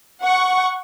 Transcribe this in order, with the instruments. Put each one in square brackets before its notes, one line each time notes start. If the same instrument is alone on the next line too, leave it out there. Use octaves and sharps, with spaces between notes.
[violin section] F#5 C#6